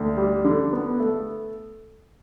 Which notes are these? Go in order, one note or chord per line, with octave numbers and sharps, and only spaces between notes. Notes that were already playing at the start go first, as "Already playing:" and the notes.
Already playing: D2
G3
D3
B3
A3